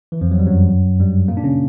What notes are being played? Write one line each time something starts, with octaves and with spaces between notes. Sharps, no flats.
E3
F2 F3
F#3
G3
F#2 F#3
G2 G3
A#2 A#3
D4
C#3 C#4